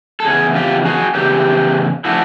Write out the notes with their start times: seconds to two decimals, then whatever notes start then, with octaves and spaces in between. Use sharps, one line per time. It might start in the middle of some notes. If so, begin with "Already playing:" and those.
0.20 A4
0.25 E2 C#3 G#4
0.55 F4 G4
0.85 F#4 G#4
1.15 E2 C#3 G4
2.05 C#3 F3 A3 D4 E4 F#4